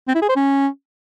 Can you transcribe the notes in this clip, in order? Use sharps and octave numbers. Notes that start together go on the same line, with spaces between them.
C4
E4
G#4
C5
C#4